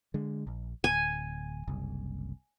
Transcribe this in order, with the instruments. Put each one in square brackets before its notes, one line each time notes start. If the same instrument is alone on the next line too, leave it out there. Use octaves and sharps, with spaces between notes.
[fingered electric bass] D3 G#3
A#1
[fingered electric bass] D1 [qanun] G#5
[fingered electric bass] F#1 C2